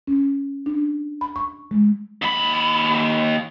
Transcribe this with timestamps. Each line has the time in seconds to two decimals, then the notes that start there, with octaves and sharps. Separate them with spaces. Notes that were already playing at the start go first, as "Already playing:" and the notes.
0.07 C#4
0.66 D4
1.21 B5
1.36 C#6
1.71 G#3
2.22 D#2 B5